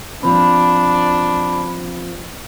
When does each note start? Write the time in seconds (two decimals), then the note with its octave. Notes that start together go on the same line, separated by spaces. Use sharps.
0.23 F3 C4 D4 B5